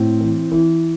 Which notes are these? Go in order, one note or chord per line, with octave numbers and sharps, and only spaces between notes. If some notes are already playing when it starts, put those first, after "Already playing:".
Already playing: A2 C4
E3
E3